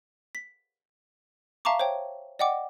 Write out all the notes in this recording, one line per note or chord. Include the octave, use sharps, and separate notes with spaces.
B6
E5 F5 A5 A#5 C#6 D6
C5 C#5 G5
D5 D#5 F#5 G5 D6